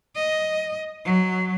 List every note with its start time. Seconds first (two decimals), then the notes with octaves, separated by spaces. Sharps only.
0.15 D#5
1.05 F#3